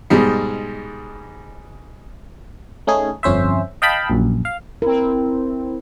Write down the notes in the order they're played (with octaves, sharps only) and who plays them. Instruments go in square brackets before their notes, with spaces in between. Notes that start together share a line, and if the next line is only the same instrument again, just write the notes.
[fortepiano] G#2 B2 G3 G#3
[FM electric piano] A3 C#4 D#4 G#4
G1 F2 C#4 C5 E5
D#5 F5 G5 A5 B5
A#1 F#2
F5
[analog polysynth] C4 E4 [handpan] A#4